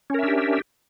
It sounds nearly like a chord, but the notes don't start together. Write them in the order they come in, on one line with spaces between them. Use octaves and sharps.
C#4 A#4 E5 D4 G4